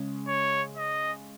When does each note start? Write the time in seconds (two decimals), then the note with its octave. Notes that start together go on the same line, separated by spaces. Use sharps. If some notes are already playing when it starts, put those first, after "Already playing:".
Already playing: C#3 G#3 C#4 G#4
0.28 C#5
0.77 D#5